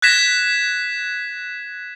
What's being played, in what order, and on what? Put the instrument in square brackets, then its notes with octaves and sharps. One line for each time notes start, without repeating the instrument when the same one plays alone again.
[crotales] F#6 G#6 A#6 B6 E7